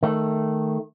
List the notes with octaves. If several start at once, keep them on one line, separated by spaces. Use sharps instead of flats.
D#3 A3